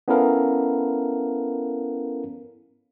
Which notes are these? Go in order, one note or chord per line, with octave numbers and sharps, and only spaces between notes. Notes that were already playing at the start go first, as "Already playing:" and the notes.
B3 C#4 E4 A4 A#4 F5